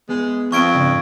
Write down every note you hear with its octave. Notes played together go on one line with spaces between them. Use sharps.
G#3 B3 G#4
F2 C#6 G#6 D7
G#2 C#3 D4